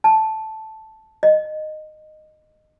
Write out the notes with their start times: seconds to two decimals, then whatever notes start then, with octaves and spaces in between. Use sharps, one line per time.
0.04 A5
1.23 D#5